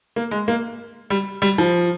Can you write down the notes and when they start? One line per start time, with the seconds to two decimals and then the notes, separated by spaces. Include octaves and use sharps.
0.16 A#3
0.31 G#3
0.48 A#3
1.10 G3
1.42 G3
1.58 F3